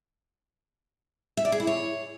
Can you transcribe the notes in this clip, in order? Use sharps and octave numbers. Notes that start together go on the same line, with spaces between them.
E5
D5
G#4
E4
C#5